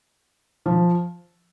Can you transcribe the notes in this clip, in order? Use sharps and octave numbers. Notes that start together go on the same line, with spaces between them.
F3